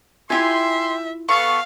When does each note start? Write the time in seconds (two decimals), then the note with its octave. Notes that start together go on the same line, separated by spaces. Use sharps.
0.30 E4 F4 G4 E5 G#5 C6
1.29 B3 A4 F5 C#6